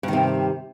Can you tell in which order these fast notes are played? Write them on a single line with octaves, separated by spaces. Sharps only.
G2 D#3 C3